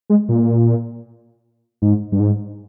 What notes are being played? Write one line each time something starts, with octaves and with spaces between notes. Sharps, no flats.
G#3
A#2
G#2
G2
G#2